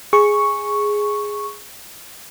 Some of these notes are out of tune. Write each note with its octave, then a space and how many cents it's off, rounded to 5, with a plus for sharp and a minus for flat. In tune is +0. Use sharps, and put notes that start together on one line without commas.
G#4 +0 C#6 +0